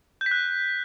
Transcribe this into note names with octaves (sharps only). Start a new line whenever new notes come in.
G6
B6
F#6